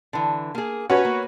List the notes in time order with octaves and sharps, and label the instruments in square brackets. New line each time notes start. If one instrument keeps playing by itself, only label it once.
[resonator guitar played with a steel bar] D3 E3
A#3 G#4
[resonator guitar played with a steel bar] C#4 [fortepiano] F#4 B4 C#5
[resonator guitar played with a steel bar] A#3